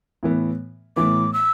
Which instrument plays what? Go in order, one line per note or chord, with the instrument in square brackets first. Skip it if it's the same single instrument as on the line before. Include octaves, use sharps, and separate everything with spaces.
[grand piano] A2 E3 B3
[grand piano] A2 E3 B3 [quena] D6
[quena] E6